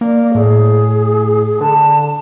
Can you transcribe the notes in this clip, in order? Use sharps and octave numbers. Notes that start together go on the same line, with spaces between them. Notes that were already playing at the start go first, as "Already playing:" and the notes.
A#3 D5
A2 G#4
D3 A5